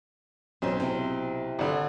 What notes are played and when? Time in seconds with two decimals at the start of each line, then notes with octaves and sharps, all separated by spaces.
0.62 B1 C4 C#4 C5
0.80 C3 C4 E4
1.59 G#1 D3